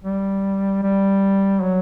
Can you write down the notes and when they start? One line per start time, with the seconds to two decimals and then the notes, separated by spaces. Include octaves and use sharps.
0.04 G3
0.83 G3
1.62 F#3